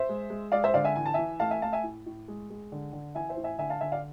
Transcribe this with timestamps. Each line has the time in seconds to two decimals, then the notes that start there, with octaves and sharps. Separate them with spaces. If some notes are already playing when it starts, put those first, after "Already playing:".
Already playing: C5 E5
0.09 G#3
0.30 G#3
0.52 G#3 D5 F5
0.64 C5 E5
0.74 D3 D5 F5
0.85 E5 G#5
0.95 E3 G#5
1.06 A5
1.14 E3 E5 G#5
1.40 A3 F5 A5
1.51 E5 G#5
1.62 A3 F5 A5
1.73 E5 G#5
1.84 A2
2.06 A2
2.28 G#3
2.50 G#3
2.72 D3
2.93 D3
3.15 E3 E5 G#5
3.29 C5 E5
3.37 A2
3.44 E5 G#5
3.58 D3 E5 G#5
3.70 F5 A5
3.81 D3 E5 G#5
3.92 D5 F5